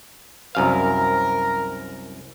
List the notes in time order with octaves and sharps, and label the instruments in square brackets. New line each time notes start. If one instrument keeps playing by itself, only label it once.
[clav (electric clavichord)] C2 F#2 F5 [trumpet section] A#4